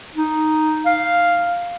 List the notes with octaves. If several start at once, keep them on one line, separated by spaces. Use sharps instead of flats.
D#4
F5